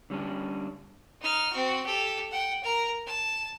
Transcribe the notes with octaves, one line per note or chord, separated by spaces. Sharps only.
D3 G3 C#4 D4
D#4 F6
C4 F#4
G4 A4
F#5 G5
A#4 A#5
A5